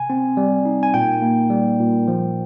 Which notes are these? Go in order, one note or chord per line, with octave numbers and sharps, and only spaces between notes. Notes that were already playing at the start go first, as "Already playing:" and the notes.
Already playing: C3 G#5
C4
G3
D#4
G#5
A#2 G5
A#3
G3
A#2
F3